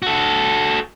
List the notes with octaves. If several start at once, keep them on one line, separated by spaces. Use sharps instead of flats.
F#4 A4